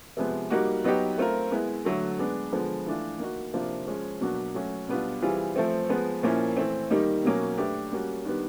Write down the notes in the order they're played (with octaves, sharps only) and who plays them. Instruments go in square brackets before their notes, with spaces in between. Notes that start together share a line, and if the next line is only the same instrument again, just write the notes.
[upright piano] C3 F3 G#3 B3
G3 A#3 D#4 F#4
F#3 B3 D#4 G4
A3 C4 F4 A#4
G#3 B3 E4
D3 F#3 A3
G#3 B3 D4
D3 F3 G#3 B3
E3 A3 D4 F4
A#3 D#4 F#4
C3 F3 A#3 D4 F4
F3 G#3 C#4
B2 F#3 A#3 D4 F#4
F#3 A3 C#4 F#4
B2 G3 B3 D4 F4
E3 G3 C4 F4 G#4
F3 A3 C4
F3 G#3 B3
A#2 F3 A#3 C#4 E4
E3 A3 C4
D#3 G3 A#3 D#4
B2 F#3 A#3 C#4
A3 D4 G4 B4
G3 A#3 C#4 F#4
D#3 G3 B3 D4